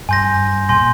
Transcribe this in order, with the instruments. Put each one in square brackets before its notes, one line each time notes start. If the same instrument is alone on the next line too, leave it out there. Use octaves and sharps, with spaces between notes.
[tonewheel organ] G2 [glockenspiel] G#5 C6 G6 A#6
[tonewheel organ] A#2 [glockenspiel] G#5 C6 G6 A#6